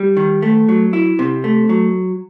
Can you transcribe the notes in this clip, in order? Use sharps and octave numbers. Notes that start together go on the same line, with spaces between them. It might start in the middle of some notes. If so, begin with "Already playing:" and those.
Already playing: G3
D#3
A3
F#3
E4
C3
A3
F#3